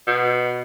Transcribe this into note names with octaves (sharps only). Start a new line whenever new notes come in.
B2